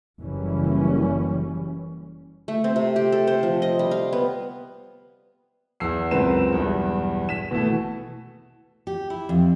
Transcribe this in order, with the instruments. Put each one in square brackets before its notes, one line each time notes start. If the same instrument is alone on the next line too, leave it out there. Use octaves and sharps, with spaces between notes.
[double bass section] F#1 E3 G3 C#4
[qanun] A3
C4
C3
G4
A4
C5
F3
D#5
G3
F5
B3
[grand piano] E2 E6 C7
C#2 F#2 C4 A#4 B4 E7
B1 E2 G2
B6 E7
B2 E3 A3
[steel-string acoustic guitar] G4
E4
F2